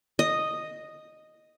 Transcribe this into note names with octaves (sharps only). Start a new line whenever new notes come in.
D#5